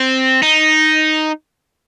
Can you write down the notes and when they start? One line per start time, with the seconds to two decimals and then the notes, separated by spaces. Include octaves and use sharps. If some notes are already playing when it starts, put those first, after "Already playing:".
Already playing: C4
0.43 D#4